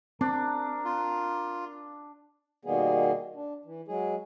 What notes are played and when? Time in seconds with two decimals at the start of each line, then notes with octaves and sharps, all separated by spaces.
0.21 C4 D4 A#4
0.85 F4
2.65 B2 D#3 G3 A#3 B3 G#4
3.35 D4
3.65 E3
3.88 F#3 G#3 G#4